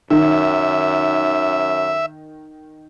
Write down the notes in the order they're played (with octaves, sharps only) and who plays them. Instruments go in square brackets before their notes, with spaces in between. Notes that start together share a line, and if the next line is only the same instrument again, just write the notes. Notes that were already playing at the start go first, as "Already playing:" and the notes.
[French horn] F#2 [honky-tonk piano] D#3 [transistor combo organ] E5